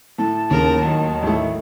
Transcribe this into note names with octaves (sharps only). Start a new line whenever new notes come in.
A2 A5
D#2 C#3 A#4
D#3 F#3
A1 A3